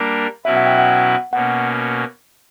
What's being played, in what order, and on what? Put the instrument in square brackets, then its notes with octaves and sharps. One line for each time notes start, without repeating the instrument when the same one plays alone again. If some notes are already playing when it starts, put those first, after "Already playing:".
Already playing: [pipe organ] G3 A#3 D4 A#4
[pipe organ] B2 F#3 C#4 E4 B4 [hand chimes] E5
[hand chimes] F#5
G5
F#5
[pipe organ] B2 A#3 C#4 [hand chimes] F#5